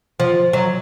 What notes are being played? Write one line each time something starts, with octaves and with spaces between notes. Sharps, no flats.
F3
F#3